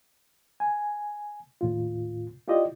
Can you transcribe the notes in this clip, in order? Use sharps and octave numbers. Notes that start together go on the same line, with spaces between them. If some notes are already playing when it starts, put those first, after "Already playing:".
G#5
D#2 A2 F4
E4 F4 G4 D5 D#5